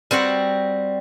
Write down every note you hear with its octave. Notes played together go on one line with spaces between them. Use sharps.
G3 C4 F#4 F#5